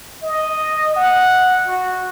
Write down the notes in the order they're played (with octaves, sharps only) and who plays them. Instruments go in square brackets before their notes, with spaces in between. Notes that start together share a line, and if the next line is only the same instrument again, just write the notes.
[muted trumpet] D#5
F#5
F#4